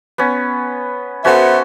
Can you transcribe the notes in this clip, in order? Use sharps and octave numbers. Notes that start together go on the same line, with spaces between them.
B3 C#4
B3 C#4 F#4 A4 C5 E5